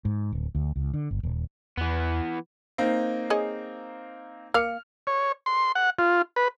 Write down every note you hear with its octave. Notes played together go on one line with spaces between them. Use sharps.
G#2
D1
D2
C#2
D3
G1
D#1
E2 E3 B3
A#3 C4 D#4
G#4 C#5 D#5
A#3 F5 F6 C#7
C#5
C6
F#5
F4
B4